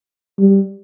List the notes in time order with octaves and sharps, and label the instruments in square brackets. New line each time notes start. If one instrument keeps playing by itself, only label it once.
[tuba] G3